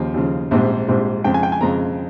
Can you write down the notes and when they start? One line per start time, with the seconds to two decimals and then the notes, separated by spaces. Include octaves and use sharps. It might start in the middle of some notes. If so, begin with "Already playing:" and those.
Already playing: D#2 C#3 F3 C5
0.14 D#2 C#3 F3
0.51 A#1 G#2 G3 C4
0.88 A#1 G#2 G3 C4
1.24 F2 C#3 G#3 C4 G5
1.34 G#5
1.43 G5
1.52 G#5
1.61 F2 C#3 G#3 C4 A#5